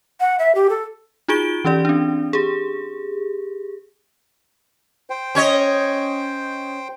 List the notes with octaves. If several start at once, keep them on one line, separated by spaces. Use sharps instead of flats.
F#5
E5
G4
A4
D#4 F4 F#4 G#4 D7 G7
E3 C#4 G4 D5
C4 D4
G4 G#4
C5 G5
C#4 C#5 D#5